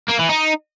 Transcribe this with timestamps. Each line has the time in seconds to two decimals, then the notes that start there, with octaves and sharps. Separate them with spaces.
0.09 A#3
0.19 E3
0.29 D#4